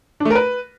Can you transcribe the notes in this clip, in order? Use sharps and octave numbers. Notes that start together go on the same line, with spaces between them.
D4
A3
A#4
B4